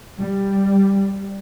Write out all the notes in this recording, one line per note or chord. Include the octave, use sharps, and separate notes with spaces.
G3